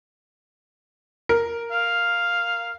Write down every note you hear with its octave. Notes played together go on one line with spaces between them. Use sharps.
A#4
F5